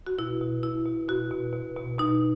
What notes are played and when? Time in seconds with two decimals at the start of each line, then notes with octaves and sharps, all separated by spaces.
0.07 F#4
0.18 B2 E4
0.41 B2
0.63 B2 E4
0.86 B2
1.09 B2 F#4
1.31 B2
1.53 B2
1.77 B2
1.99 B2 D#4